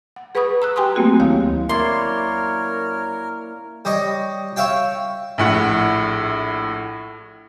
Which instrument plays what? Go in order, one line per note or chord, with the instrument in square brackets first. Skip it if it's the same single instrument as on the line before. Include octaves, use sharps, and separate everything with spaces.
[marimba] F#5
G#4 B4 F#5 B5 C#6 D#6
A#5 E6 F#6
G4 G5 G#5 A#5 C6 D#6
F#3 A3 A#3 C4 F#4 G#4
D2 D#3 E4 C#5 F5
[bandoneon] F#2 C#5 [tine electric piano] A#3 E4 D5 [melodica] A#4 [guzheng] C6
[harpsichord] G3 C#5 D#5
C#5 E5 F5 G5
[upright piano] A#1 A2 F#5